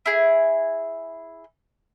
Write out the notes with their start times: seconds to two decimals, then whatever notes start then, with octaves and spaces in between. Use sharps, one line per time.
0.06 E4 G#4